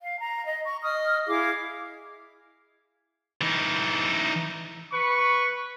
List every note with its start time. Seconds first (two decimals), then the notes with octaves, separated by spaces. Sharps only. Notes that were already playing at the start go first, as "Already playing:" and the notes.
0.02 F5
0.20 A#5
0.44 D#5
0.66 C#6
0.83 D#5 D#6 F6
1.28 E4 G#4 F5 D6
3.41 E3 D#4
4.93 B4 C#6